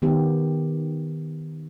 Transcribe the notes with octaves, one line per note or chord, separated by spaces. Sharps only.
D#3 B3 G4